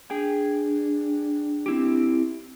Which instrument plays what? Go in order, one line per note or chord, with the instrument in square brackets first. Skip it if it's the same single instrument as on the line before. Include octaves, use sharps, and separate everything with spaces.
[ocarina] D4 [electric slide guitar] G#4 G5 G#5
[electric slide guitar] C4 E4 G4